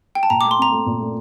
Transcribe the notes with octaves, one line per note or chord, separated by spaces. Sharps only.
G5
A5
A#2 A#5
D6
A3
C6
C4 A#5
A3
A#2
A3